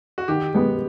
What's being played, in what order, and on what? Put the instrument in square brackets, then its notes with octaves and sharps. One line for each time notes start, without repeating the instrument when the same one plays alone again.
[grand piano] F#4
[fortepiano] D#3 [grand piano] G4
[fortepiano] G#3 B3